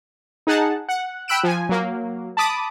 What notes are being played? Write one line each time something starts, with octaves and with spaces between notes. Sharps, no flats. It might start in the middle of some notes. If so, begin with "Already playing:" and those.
D#4 G#4 F#5 A5
F#5
G5 B5 E6 F#6 D7 E7
F3 G#5
F#3 A#3
A5 B5 D6 D#6